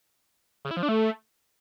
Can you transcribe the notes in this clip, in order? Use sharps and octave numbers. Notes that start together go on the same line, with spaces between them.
C#3
E4
F3
D4
A3